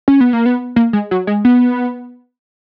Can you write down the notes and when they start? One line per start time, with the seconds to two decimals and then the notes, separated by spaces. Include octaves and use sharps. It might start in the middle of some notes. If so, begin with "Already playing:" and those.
0.08 C#4
0.21 B3
0.33 A#3
0.46 B3
0.76 A#3
0.93 G#3
1.11 F#3
1.27 G#3
1.45 B3